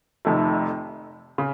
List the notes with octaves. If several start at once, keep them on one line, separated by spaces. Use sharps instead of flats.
F1 F2 C3 D#3 A3
C#3